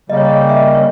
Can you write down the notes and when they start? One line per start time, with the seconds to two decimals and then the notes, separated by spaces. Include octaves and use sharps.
0.09 C#3 G3 A#3 D#5
0.17 C#5
0.25 D#5
0.33 C#5
0.49 E5
0.56 D#5
0.75 C#5